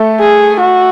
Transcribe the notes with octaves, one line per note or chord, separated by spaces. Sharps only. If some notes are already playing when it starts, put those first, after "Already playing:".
Already playing: A3 A4
G#4
F#4